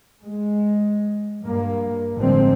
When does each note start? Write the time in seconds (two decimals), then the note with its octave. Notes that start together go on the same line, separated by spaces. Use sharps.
0.23 G#3
1.42 G2 A#3
2.15 A1 D3 F3 G3 G#3 C4